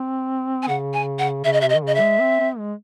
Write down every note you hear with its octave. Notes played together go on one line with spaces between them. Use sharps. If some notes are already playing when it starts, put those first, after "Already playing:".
Already playing: C4
G#5
C#3 F#5
G#5
F#5
C#3 E5
D#5
C3 E5
D#5
D#3
C#3 D#5
E5
G#3
C4
C4
G#3